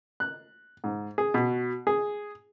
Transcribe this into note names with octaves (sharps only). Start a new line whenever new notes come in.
F#6
G#2
G#4
B2
G#4